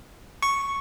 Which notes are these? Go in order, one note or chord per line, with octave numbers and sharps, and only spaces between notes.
C#6